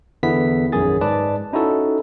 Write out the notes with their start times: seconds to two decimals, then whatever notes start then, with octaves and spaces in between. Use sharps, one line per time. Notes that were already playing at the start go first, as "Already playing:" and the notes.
0.23 E2 D3 B3 E4 B6
0.72 A#1 F#2 D#3 G#4 A6
1.01 G#2 B4 D5 A5
1.52 C#4 D#4 E4 F#4 A4